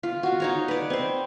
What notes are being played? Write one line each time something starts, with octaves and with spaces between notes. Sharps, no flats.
F4
F4 F#4
D#4 C#5 A#5
B4 D5
C4 C5